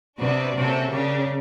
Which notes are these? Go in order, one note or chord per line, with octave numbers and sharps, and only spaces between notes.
C3 B3 D4 F#4 B4 D5
C3 A#3 C#4 F#4 A4
C#3 D4 G4 A#4 C#5